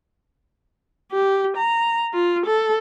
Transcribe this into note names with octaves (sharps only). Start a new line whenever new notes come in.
G4
A#5
F4
A4